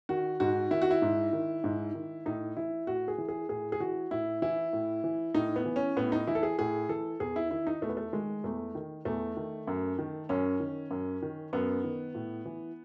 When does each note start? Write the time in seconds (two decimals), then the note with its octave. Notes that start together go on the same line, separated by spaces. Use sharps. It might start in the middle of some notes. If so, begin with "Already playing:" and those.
0.09 D#3 F#4
0.40 G#2 F#4
0.71 D#3 E4
0.82 F#4
0.91 E4
1.02 G#2
1.33 D#3
1.64 G#2
1.94 D#3
2.26 A2 D#4
2.57 E3 E4
2.87 A2 F#4
3.08 G#4
3.18 E3
3.29 G#4
3.49 A2 G#4
3.72 G#4
3.80 E3 F#4
4.11 A2 E4
4.42 E3 E4
4.73 A2
5.04 E3
5.34 A2 D#4
5.56 B3
5.66 E3
5.76 C#4
5.97 A2 B3
6.12 D#4
6.27 E3 E4
6.35 A4
6.43 G#4
6.58 A2 G#4
6.89 E3 A4
7.20 E2 G#4
7.36 E4
7.51 D#3 E4
7.67 D#4
7.82 E2 A3
7.89 B3
7.97 A3
8.13 D#3 G#3
8.44 E2 A3
8.75 D#3
9.05 E2 A3
9.37 D#3
9.67 F#2
9.99 D#3
10.29 F#2 C#4
10.60 D#3
10.91 F#2
11.22 D#3
11.53 F#2 B3
11.84 D#3
12.15 A2
12.46 E3